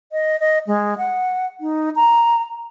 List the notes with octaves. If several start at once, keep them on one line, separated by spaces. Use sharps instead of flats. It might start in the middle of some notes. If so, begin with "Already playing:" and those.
D#5
D#5
G#3
F#5
D#4
A#5